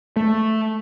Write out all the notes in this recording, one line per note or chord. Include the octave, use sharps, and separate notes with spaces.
A3